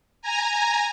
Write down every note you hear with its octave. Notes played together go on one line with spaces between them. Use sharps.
G#5 A#5